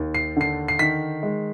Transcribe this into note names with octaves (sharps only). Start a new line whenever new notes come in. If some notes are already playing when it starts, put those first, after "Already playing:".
Already playing: D#2
C7
D3 C7
C7
D#3 B6
G#3